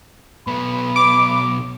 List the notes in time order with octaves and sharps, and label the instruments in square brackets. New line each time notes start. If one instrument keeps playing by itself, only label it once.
[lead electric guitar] B1 B3 [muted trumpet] B5
[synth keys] D6